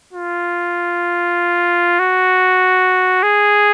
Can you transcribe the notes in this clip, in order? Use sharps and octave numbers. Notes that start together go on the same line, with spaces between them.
F4
F#4
G#4